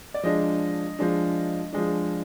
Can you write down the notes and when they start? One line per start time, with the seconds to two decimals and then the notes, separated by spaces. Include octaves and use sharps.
0.14 D5
0.23 F3 G#3 D4 D#5
0.99 F3 G#3 D4
1.73 F3 G#3 D4